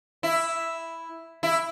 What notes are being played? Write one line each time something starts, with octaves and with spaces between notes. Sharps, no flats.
E4
E4